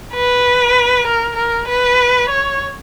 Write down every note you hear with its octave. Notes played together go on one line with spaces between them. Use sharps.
B4
A#4
A#4
B4
C#5